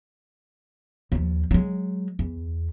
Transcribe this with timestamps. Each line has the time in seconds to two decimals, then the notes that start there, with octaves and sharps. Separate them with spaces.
1.12 D#2 F3
1.51 F#3 G#3
2.19 E2